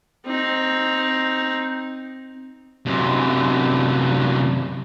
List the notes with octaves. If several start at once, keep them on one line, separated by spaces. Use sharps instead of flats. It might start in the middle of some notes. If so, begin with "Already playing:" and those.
C4 D#4
F#2 C3